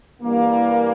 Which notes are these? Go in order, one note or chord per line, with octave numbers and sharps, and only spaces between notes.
G2 E3 G3 A#3